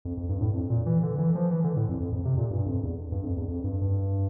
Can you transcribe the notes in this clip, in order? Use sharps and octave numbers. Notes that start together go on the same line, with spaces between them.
F2
F2
G2
A2
F2
A#2
E3
D3
E3
F3
E3
D3
A2
F2
F2
F2
C3
A#2
G2
F2
E2
G2
F2
E2
F2
G2
G2